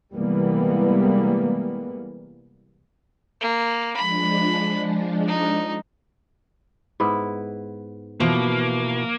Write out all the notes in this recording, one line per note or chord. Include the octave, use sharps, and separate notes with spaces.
C3 E3 G3 G#3 A#3 B3
A#3
F3 G#3 D4 B5
D#4
G#2 B3 E4
B2 E3 F3 A#3 F#4